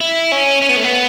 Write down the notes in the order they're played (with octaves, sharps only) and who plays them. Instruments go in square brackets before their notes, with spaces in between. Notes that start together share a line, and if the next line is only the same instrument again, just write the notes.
[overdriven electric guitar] E4
C#4
C#4
B3
A3
B3